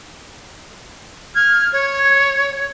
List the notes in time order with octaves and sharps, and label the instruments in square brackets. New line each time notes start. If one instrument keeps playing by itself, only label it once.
[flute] F6 [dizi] G#6
[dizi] C#5 [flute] G#6